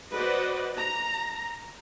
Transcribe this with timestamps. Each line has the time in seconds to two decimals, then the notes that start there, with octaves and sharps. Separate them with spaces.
0.15 F#4 B4 C5 D5 D#5 F#5
0.79 A#5